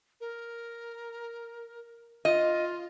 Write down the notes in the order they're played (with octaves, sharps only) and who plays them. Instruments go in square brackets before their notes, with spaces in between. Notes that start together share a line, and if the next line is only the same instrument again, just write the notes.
[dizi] A#4
[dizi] F4 [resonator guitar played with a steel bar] D#5